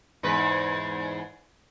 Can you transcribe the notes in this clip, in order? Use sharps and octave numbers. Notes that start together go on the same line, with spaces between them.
E2 G#2 B4